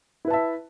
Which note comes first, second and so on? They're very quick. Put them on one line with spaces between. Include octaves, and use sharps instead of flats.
E4 B4 A5 E5